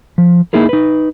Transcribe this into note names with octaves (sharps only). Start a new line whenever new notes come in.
F3
A#3 D#4 E4 G#4 A#4
D#4 B4